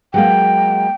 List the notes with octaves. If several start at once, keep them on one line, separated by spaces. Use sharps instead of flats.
F#3 G#3 A#3 G5